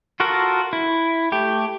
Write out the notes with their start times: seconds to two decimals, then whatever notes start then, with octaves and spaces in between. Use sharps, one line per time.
0.20 F4 F#4 A4 A#4
0.73 E4
1.32 A3 G4